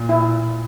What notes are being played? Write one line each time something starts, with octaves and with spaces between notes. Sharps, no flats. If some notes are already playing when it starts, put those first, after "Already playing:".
Already playing: A#2
E4